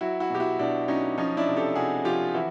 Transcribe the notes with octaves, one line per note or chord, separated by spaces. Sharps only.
F#3 E4 F#4
E4 F#4
B2 G4
E4 F#4
B2 D4 E4
F#3 C#4 D#4
F3 C#4 D#4
D4 E4
C3
G4 A4
C3 F#4 G#4
F3 F4 G4
E3 E4 F#4